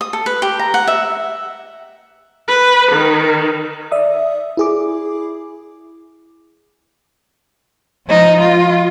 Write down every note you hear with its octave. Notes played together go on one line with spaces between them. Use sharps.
D#6
A4
B4
G4
A#5
F#5
E5
B4
D#3
D5 E5 D#6
E4 G#4 D6
F3 D#4
F4